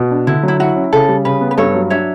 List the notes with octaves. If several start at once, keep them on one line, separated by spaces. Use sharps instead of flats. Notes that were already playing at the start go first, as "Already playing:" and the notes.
Already playing: B2
D4
D3 E4
F#3 E4
E4 F#4
C#4
C#3 A4
G3
C#3 B4
B3
B4
G2 A4 C#5
F#3
D4 C#5 E5